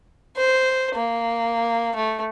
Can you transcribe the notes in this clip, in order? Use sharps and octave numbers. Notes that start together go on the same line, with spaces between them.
C5
A#3
A3